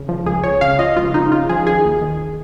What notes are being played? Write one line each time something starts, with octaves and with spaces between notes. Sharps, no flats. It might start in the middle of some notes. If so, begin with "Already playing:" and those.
Already playing: C#3
F3
C#2 G#4
C#2 C#5
C#3 F5
F3 D#5
C#2 F4
C#2 D#4
C#3 F4
F3 G#4
D#3 G#4
D#2
D#3